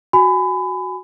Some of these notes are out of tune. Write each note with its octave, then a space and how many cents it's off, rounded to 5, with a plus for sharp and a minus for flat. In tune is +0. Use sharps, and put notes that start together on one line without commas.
F#4 +0 G#5 +0 B5 +25